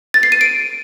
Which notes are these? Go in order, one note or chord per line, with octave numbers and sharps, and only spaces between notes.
A6
C7
D#7
D7